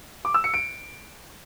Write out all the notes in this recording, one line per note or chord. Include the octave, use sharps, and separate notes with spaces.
D6
E6
C#7
D7